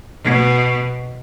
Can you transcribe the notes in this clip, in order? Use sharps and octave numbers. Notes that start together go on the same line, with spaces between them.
B2